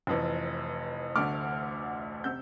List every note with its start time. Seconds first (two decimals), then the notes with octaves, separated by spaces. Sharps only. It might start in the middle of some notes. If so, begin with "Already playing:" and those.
0.07 F1 F2 E3
1.16 D2 D3 A3 D6 F6
2.24 C3 E6 G6